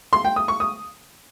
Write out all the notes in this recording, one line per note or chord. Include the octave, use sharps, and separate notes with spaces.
C6
G5
D#6
C#6
D#6